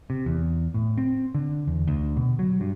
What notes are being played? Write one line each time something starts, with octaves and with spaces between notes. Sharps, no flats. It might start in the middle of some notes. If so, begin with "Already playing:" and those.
C3
E2
A2
C4
D3
E2
D2
B2
F#3
G2